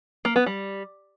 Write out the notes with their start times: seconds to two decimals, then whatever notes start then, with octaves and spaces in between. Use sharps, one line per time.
0.25 A#3
0.36 B3
0.46 G3